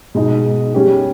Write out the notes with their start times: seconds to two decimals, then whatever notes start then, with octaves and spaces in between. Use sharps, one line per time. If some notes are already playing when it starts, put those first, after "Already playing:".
0.15 B2 G#3 D#4
0.74 G3 C#4 G4